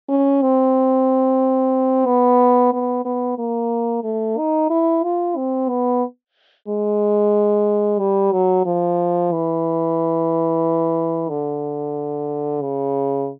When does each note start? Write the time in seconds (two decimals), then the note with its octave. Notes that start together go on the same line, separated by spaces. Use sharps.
0.09 C#4
0.42 C4
2.06 B3
2.73 B3
3.05 B3
3.39 A#3
4.04 A3
4.38 D#4
4.70 E4
5.03 F4
5.36 C4
5.69 B3
6.68 G#3
7.99 G3
8.32 F#3
8.66 F3
9.32 E3
11.30 D3
12.62 C#3